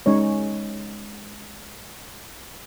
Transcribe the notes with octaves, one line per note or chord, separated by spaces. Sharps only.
G#3 C#4 D#4 C#5